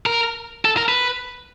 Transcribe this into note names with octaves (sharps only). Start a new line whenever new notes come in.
A#4
A4
A#4
B4